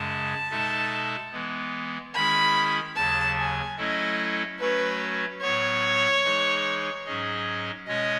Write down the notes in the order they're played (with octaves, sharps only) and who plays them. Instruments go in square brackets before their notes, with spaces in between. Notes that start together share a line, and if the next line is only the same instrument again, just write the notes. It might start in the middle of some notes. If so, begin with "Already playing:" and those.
Already playing: [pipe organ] F#2 C#3 G#3 [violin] A5
[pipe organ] B2 G#3 D#4 A4 E5
E3 G#3 B3
[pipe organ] D#3 G#3 C#4 E4 G#4 [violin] B5
[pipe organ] D#2 C#3 F#3 [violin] A5
[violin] G#5
[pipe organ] F#3 A3 C#4 E4 A4 [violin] D#5
[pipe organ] F#3 A3 C#4 F#4 C#5 [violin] B4
[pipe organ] A2 F#3 B3 [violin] C#5
[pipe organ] E3 G#3 D#4 G#4
G#2 F#3 C#4 G#4 D#5
[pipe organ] B2 G#3 C#4 C#5 [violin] D#5